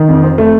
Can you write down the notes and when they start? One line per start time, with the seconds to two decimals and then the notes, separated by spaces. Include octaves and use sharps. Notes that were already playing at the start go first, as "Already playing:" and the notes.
Already playing: D#3
0.09 F2
0.23 C4
0.38 A3